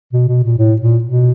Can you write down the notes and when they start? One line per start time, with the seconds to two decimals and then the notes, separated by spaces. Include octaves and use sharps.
0.13 B2
0.28 B2
0.44 A#2
0.58 A2
0.82 A#2
1.04 B2